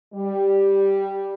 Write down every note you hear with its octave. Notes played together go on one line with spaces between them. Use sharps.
G3